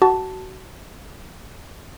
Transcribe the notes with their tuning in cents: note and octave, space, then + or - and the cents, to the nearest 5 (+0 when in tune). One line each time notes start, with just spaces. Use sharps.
F#4 +25 A5 +0